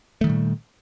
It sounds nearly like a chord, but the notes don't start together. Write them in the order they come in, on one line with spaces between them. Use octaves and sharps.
A3 D#3 G3 A#2